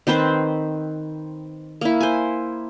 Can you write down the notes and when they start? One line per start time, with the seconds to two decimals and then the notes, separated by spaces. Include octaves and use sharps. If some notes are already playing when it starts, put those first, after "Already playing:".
0.07 D#3 C4 B4 C5
1.81 A#3 E4
2.00 C5 G#5